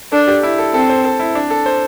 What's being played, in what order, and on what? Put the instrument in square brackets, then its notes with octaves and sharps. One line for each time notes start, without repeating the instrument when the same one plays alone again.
[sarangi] D4 [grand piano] A4
[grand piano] G4
E4
A4
[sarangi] C4 [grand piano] A4
[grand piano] C5
A4
E4
D4
A4
C5